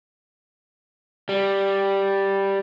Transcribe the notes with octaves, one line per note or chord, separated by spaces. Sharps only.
G3